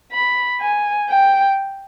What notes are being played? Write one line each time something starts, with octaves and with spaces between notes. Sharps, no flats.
B5
G#5
G5